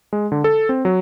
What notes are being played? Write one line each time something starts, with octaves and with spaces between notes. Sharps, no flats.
G#3
D3
A4
C4
F#3